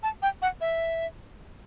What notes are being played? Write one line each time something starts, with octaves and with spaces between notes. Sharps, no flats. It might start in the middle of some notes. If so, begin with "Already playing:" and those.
A5
G5
F#5
E5